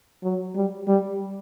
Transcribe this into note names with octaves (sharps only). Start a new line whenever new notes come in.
F#3
G3
G3